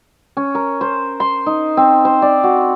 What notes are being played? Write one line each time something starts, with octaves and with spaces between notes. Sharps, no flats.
C#4
A#4
C5
C6
D#4
C4
C5
D5
F#4